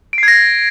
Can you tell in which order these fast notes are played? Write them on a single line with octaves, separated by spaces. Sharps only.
D7 C7 G#6 A#6